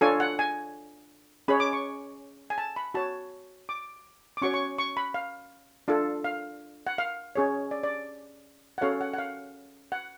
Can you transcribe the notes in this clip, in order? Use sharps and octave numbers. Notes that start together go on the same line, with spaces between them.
D4 F4 A4 C#5 G#5
F#5
G#5
C#4 G#4 C#5 B5
D6
C#6
G#5
A5
B5
F#4 C#5 A5
D6
D6
C#4 F#4 C#5 C#6
C#6
C#6
B5
F5
D4 F4 A4
F5
F#5
F5
C#4 G#4 C#5
D5
D5
F#5
C#4 F#4 A4 C#5 F5
F#5
F#5
F5
F#5